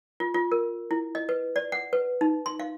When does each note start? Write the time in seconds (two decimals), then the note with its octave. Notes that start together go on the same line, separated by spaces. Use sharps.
0.20 F4
0.34 F4
0.52 A#4
0.91 E4
1.15 D#5
1.29 B4
1.56 D5
1.72 F#5
1.93 B4
2.21 D#4
2.46 C6
2.59 F5